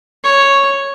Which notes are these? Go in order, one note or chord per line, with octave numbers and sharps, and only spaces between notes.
C#5